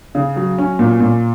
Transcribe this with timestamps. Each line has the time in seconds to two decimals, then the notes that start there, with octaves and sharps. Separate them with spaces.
0.15 C#3
0.36 F#3
0.58 C#4
0.79 A#2
1.00 A#2